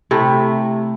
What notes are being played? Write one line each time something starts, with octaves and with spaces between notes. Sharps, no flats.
C3 A3 E4